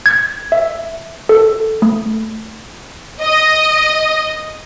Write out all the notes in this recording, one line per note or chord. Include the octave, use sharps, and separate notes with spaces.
G#6
E5
A4
A3
D#5